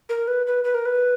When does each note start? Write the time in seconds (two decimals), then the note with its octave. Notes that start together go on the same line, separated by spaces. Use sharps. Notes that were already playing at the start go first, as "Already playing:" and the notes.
0.09 A#4
0.28 B4
0.47 B4
0.64 B4
0.75 A#4
0.86 B4